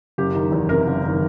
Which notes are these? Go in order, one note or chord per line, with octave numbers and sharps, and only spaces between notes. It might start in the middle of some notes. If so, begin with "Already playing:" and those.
F#1 G4
D#3
E2
C3 A#4
F#1
D#3